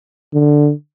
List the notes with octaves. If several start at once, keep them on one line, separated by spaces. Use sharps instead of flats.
D3